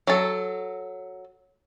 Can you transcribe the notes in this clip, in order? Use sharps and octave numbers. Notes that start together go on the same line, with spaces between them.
F#3 A4